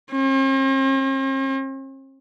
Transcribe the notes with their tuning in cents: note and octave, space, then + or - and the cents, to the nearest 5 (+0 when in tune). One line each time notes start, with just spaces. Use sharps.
C4 +45